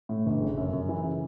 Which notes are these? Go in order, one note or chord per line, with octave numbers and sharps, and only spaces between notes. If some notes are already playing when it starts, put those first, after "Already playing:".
A2
G1
C#3
F#2
F#2
E3
C#3